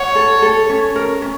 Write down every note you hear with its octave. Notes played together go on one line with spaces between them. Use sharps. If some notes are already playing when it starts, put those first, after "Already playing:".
Already playing: C#5 F#5
A4
A4
C#4
A#4
C#4